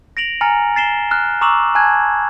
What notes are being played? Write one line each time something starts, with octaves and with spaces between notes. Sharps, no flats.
A#6 D7 F7 F#7
G#5 A#5 F6 A6 C#7
A6 C7 E7 G7
F6 F#6
A#5 C#6 D6 E6 E7 F#7
G#5 A5 F#6 G#6